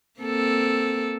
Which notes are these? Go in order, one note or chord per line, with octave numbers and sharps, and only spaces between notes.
A#3 C4 A4